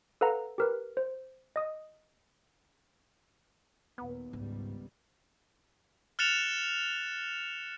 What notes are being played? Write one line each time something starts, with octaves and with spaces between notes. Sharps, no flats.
A4 B4 F5 F#5 A#5
G4 A#4 B4
C5
D#5 D#6
D#2 A#2 B3
G#1 C#2 G#2 G3
F6 F#6 A6 C#7 E7 F7